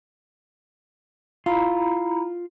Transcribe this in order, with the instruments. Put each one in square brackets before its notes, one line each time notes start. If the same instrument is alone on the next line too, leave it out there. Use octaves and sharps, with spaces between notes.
[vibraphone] E4 A#5 B5 [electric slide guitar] F4